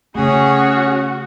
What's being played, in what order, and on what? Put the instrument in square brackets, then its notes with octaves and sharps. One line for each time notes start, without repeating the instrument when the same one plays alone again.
[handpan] C#3 A3 [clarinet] C#4 [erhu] F#4 [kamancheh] G#4 C#5